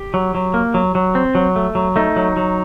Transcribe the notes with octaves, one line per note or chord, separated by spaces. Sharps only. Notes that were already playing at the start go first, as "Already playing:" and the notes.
Already playing: G4
F#3
F#3
A#3
F#3
F#3
C4
F#3
A3
F#3
A3 D#4
F#3
F#3